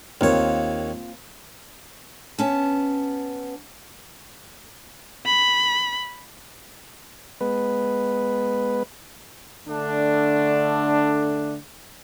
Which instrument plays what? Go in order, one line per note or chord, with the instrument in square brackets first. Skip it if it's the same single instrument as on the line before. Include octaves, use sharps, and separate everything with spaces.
[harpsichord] D#2 C#5 [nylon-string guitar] A#3 C4 F4
[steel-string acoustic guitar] B3 C#4 A5
[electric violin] B5
[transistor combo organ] G#3 B3 B4
[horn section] D3 A3 D4